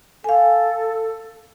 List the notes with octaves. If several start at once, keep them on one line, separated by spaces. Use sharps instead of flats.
A4 F5 G#5